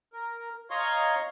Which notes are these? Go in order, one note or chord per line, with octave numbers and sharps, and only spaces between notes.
A#4
C#5 D#5 F5 A#5 C6 C#6